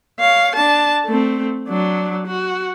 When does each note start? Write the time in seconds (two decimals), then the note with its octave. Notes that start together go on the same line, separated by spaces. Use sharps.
0.20 C#5 F5
0.55 D4 A5
1.05 A3 C4
1.68 F#3 D4
2.27 F#4